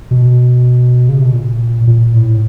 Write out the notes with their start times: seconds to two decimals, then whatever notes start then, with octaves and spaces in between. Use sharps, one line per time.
0.11 B2
1.09 C#3
1.18 C3
1.25 B2
1.33 A#2
1.87 A#2
2.14 A2